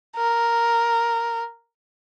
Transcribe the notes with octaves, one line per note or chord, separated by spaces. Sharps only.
A#4